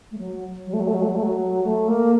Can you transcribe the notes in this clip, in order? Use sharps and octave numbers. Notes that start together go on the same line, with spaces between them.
A3
F#3
F#3
A3
F#3
A3
F#3
A3
F#3
A3
F#3
A3
A#3